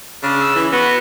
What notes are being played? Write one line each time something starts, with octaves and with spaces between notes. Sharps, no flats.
C#3 D4
E6
E3
B3 F#4